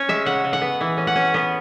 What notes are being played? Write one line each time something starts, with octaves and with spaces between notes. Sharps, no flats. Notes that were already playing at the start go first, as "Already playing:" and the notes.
Already playing: C#4 C#5
G#3 E5
C#3 F#5
C#3
F#5
B3
E3
C#4
F#5
C#4
B3